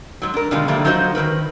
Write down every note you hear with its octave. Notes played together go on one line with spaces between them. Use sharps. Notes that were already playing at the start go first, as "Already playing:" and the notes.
G#2 F#3
D4 A#4
B2 D3 D#3 G3 G#3 F4
D3 F3 G3 A3 A#3
F#3 D#4 F4 F#4 C5 D#5
D#3 F#3 A#4 B4